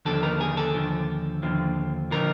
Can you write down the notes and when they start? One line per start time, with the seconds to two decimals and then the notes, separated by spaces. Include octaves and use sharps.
0.05 D#2 D3 F3 A4
0.23 A#4
0.41 G#4
0.57 A4
0.74 D#2 D3 F3
1.43 D#2 D3 F3
2.11 D3 F3 A#4